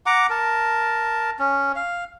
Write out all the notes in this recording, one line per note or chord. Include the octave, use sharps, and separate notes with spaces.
F#5 A#5 D6
A#4 A5
C#4
F5